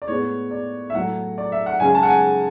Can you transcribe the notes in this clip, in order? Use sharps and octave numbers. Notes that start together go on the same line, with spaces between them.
D5
A2 G#3 B3 C#5
D5
E5
A2 F#3 A3 F#5
D5
E5
F#5
F#2 C#3 G#3 C#4 G#5
A5
F#5
G#5